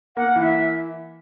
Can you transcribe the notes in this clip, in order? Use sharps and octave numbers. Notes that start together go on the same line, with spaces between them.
A#3 F#5
E3
E5